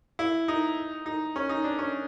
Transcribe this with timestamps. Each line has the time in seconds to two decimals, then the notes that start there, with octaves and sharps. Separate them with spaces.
0.19 E4
0.48 D#4
1.06 D#4
1.36 C#4
1.49 D#4
1.64 D4
1.79 C#4